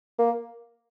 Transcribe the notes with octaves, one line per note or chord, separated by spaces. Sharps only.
A#3